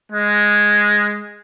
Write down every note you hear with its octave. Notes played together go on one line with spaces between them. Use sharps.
G#3